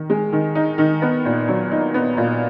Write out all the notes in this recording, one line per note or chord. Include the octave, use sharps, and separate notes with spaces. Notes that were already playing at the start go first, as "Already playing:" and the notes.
Already playing: D#3
G#3
D#3
D#4
D#3
B3
A#2
F#3
D#4
B3
A#2